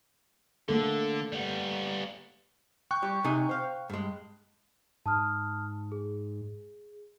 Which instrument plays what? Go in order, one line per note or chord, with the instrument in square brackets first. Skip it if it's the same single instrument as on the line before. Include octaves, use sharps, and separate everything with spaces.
[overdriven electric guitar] D3 [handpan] A3 A#3 A4
[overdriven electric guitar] G3 B3
[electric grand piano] G5 C#6 F#6
[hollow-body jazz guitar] G3 G4
C3 D#4 G#5
C5 F5
G2 G#3
[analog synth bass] G#2 [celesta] A5 D#6 F6
[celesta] G#4